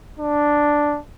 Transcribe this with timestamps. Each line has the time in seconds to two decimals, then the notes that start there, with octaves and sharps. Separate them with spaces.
0.19 D4